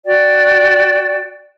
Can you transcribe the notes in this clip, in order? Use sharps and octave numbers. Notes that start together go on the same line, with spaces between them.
F#4 D5 G5